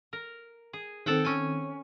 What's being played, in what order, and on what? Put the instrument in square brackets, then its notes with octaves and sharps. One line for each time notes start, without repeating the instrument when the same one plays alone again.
[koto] A#4
G#4
[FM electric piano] D#3 C4 [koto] A4 F#5 G5
[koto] C#4 G#5